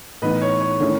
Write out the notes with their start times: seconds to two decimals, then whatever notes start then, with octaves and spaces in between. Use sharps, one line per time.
0.22 A2 E3 B3 D#4 B4 D#5
0.42 C#5
0.61 C#5
0.80 D#3 A3 C#4 E4